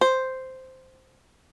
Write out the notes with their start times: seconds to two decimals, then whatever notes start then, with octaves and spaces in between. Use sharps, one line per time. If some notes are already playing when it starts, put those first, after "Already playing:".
0.01 C5